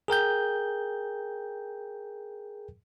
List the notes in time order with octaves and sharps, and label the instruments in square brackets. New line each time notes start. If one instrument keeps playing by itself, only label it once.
[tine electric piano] G#4 A#4 G5 G6